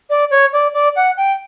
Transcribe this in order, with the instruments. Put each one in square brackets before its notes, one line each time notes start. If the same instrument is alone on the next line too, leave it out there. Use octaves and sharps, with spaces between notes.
[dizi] D5
C#5
D5
D5
F#5
G5